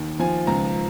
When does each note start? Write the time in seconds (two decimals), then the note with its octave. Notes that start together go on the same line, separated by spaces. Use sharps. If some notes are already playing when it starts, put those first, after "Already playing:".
Already playing: D#2
0.19 F3 G#5
0.47 C#2 A#5